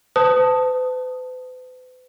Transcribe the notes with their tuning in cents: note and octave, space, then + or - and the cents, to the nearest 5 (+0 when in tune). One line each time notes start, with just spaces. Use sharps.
B4 +45 A5 +10 D#6 +0